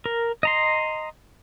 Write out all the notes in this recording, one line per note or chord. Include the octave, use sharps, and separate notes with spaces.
A#4
D#5 A#5 C6